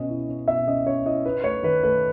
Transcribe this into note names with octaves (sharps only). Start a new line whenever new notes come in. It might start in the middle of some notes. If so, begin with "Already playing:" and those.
Already playing: B2 C#4 D#5
E4
C#4
B2 E5
C#4 D#5
C#4 C#5
E4 D#5
D#4 B4
A3 C#5
D#3 B4
A3 B4